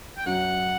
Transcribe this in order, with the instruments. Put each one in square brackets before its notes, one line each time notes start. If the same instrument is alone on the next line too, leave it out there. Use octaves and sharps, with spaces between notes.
[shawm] G5
[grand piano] F#2 F#3 [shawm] F#5